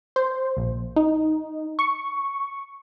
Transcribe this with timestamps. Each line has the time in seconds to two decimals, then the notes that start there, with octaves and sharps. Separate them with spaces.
0.16 C5
0.57 A#1
0.96 D#4
1.79 C#6